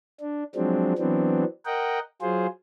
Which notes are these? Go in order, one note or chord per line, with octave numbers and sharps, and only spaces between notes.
D4
F3 F#3 G#3 C4 D4
E3 F#3 B3 C4 D4
A#4 D#5 F#5 G5
F#3 F4 G#4 C5